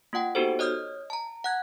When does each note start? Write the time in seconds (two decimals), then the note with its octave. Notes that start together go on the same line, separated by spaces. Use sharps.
0.13 A#3 F4 F#5 G5
0.35 B3 D#4 F#4 G4 A4 C5
0.59 C#5 D#5 D#6 F6 G6
1.10 A5 A#5
1.44 F#5 F#6 G#6